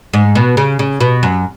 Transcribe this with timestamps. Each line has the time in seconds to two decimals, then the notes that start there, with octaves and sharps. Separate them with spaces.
0.13 G#2
0.35 B2
0.57 C#3
0.79 C#3
1.00 B2
1.23 F#2